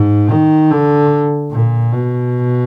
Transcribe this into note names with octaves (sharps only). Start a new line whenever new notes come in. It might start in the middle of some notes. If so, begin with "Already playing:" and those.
Already playing: G#2
D#3
D3
A#2
B2